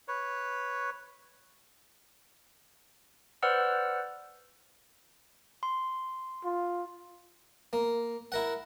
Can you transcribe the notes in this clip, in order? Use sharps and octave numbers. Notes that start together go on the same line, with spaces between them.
B4 C#5
B4 C5 D5 F#5 E6 F6
C6
F4
A#3
E4 A#4 F#5